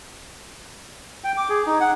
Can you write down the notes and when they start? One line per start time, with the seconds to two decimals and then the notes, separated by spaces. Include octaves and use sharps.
1.24 G5
1.37 D6
1.49 G#4
1.67 D#4
1.81 F#5